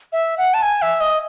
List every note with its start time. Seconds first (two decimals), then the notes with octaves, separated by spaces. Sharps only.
0.13 E5
0.38 F#5
0.54 A5
0.62 G#5
0.82 E5
1.01 D#5